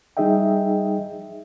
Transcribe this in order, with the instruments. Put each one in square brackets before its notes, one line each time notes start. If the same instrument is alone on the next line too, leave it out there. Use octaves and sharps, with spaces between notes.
[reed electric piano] G3 D#4 G#4 D#5 E5 G5